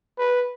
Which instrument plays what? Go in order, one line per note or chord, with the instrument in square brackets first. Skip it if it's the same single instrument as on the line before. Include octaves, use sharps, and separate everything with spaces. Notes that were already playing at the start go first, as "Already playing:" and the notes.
[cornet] B4